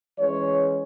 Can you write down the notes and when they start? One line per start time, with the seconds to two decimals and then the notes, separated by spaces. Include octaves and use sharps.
0.18 E3 G#3 C#4 C#5